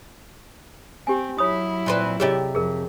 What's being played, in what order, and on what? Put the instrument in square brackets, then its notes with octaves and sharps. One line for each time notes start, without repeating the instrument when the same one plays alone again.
[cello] C4 [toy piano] G4 G#5
[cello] F#3 E4 [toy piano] C#5 B5 D#6
[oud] A#2 C4 B4
[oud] C3 G4 E5 [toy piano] G#4 C#5 D#5
[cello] F2 [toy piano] G#4 A#4